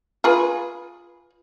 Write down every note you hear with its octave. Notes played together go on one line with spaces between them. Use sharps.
F4 G#4 B4